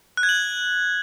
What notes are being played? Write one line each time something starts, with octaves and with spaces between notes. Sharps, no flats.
F#6
G#6
F#7